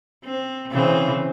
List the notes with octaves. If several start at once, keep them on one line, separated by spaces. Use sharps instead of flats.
C4
C#3 E3 C4